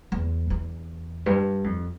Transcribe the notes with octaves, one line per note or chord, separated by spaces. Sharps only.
E2
E2
G2
F2